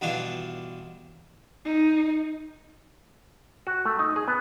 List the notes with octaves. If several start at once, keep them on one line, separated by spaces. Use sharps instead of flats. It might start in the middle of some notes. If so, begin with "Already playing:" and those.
G2 B2 E3 D4 F4
D#4
F#4
A3
D#4
G#4
B3